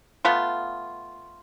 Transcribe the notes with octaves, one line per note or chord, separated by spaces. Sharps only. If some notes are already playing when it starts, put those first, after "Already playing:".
A3 B3 F4